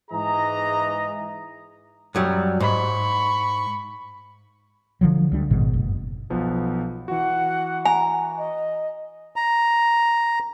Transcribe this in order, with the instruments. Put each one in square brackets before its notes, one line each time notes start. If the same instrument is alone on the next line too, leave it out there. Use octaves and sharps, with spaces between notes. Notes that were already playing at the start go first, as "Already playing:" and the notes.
[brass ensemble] G#2 E3 G#4 D#5 A#5
[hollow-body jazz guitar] F#2 F#3 G3
[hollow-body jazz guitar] G#2 [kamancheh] B5 C#6
[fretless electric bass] D3 F3 F#3
D2 G3 D4
A1 G#2 B2 D#3
F#1
[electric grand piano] B1 F3 B3
[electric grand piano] E3 F#4 [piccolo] F#5
[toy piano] G#5 [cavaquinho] A#5
[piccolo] D#5
[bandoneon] A#5